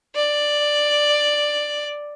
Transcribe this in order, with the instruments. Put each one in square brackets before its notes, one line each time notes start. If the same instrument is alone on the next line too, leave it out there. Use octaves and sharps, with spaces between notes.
[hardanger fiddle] D5